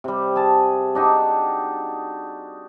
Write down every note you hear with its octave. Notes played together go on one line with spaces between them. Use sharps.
C3 G3
G#4 A5
D4 D#4 F#4 G4